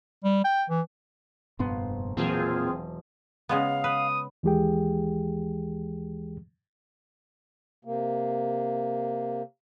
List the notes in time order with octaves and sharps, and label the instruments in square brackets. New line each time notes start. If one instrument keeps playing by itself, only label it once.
[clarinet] G3
G5
E3
[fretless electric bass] F1 G2 B3 [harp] A#1 C6
[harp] E1 F#3 [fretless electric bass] A#2 [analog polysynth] C4 F4 G#4
[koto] C#3 G#3 B3 [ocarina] F5
[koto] B4 [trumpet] D#6
[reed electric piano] D#2 E3 G#3 G4 G#4 G5
[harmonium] C3 A#3